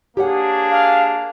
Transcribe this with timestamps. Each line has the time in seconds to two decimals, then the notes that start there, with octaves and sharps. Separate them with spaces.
0.17 A#3 D4 G4 G#4 C#5 F#5
0.70 F5